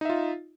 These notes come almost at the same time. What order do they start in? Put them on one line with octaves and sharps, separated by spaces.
D#4 E5 F4